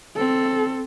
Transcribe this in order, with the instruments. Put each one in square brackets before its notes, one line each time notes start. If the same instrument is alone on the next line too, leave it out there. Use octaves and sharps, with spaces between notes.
[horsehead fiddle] C4 A4